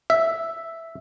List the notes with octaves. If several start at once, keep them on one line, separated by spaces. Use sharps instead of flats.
E5